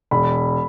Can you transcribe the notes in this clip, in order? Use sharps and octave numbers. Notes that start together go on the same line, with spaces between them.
E1 B5